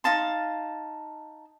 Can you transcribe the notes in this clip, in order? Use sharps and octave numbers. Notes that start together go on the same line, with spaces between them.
D#4 F5 A5 C6